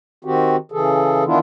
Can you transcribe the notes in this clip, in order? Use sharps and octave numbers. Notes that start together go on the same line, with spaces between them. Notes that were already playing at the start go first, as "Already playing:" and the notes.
D#3 C4 F#4 G4
C#3 E3 G#4 A4
D#3 E3 B3 D4 E4 F4